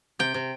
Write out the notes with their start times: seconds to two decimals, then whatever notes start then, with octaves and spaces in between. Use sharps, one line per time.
0.19 C3 G5
0.34 C3